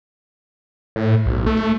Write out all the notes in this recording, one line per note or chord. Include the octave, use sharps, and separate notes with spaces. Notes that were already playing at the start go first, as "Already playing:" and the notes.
A2
B1
A3